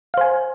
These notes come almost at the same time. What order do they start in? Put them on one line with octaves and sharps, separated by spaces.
F5 C5 G#5